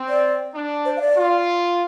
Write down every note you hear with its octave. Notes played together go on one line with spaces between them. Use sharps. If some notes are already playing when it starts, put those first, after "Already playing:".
Already playing: C4
D5
D4
C5
F5
D5
F4